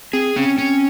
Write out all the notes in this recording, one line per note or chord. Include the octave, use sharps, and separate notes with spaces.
C4 G#4
C4 C#4
C#4